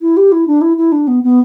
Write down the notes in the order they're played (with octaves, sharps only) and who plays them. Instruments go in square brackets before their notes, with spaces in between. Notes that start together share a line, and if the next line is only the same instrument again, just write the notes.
[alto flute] E4
G4
E4
D4
E4
E4
D4
B3
B3